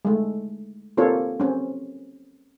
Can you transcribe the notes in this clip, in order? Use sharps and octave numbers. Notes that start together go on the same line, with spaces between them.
G#3 A3
A#3 C4 F4 A4 C#5
C4 C#4